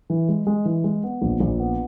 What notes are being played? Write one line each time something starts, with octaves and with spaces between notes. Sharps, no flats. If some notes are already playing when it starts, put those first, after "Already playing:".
E3
G#3
G#3
E3
G#3
B3
A#1
A#1
B3